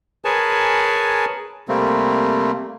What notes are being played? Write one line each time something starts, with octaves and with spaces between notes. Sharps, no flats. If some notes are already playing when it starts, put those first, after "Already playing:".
G#4 A#4 B4 C#5 G#5 A5
C3 G3 A3 A#3 C4